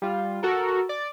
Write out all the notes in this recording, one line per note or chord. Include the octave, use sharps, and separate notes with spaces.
G3 F4
F#4 A4 A#4
D5